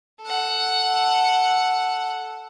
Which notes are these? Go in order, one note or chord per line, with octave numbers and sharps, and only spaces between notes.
A4 F#5